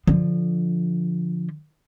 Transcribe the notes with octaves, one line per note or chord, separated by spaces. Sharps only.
D3 F3